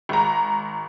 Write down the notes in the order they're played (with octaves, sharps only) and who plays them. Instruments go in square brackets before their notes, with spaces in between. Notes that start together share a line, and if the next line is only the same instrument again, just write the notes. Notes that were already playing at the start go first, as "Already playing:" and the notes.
[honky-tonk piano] G#1 A#5